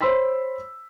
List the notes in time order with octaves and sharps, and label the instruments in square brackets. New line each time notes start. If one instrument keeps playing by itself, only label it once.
[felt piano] C5 C#5 B5 C6 E6 B6